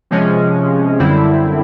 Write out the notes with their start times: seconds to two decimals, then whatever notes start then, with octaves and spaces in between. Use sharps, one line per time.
0.11 C3 F3 G#3 C#4
0.99 F#2 D3 G3 C4 E4